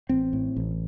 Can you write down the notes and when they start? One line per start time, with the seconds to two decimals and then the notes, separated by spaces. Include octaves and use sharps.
0.09 A1 C4
0.33 A2
0.57 A1